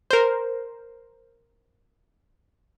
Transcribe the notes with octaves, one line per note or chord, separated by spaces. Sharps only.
A#4 C5